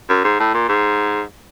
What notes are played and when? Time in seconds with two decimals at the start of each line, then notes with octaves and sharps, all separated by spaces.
0.09 F#2
0.25 G#2
0.40 A2
0.54 A#2
0.69 G#2